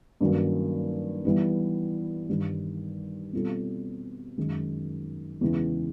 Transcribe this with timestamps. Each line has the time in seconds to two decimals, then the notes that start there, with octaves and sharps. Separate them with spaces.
0.21 G2 D#3 F#3 A#3 C#4
1.25 E3 G3 B3
2.29 G2 D#3 G3
3.33 B2 G3 C4 F4 A4
4.38 F#2 D#3 G#3
5.41 E2 C#3 E3 G#3